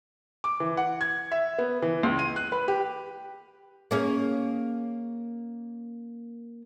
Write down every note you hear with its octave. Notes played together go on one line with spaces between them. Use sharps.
D6
E3
F#5
G#6
E5
B3
E3
C#2
D#7
F#6
B4
G4
A#3 C#4 G#4